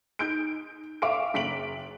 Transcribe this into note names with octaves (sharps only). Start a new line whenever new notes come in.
D#4 G6 D7
E5 F5 C#6 D6 D7
F#1 B6 D7 F#7